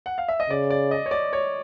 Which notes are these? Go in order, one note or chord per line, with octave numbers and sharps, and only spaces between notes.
F#5
F5
E5
D#5
C#3 D5
D5
D#5
C#5
D5
C#5